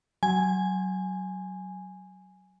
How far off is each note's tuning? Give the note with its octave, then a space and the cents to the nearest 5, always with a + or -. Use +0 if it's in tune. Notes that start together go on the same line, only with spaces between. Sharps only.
F#3 +20 G#5 +0